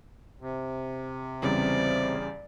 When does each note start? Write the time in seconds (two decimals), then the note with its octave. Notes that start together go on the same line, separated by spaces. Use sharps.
0.41 C3
1.42 E2 C#3 G3 C4 D5